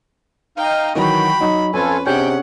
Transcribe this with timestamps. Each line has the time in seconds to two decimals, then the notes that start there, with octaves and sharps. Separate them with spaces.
0.57 D#4 D#5 F5 G5
0.95 D#3 E3 F#3 F#4 G5 B5
1.41 F#3 D#4
1.74 F2 C#4 F4 A4 B4 G#5
2.06 C3 C#4 D4 G#4 F#5 G5 G6